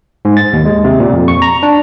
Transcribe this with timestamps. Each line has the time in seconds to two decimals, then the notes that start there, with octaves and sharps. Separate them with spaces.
0.25 G#2
0.37 A6
0.53 D#2
0.65 G#3
0.84 C3
1.00 A#2
1.13 F2
1.28 C#6
1.42 A#5
1.63 D4